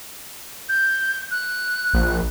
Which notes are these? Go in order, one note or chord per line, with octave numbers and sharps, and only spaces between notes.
G6
F#6
A#1